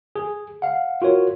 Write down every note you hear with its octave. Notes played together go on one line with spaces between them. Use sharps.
G#4
F5 F#5
F4 F#4 A#4 C#5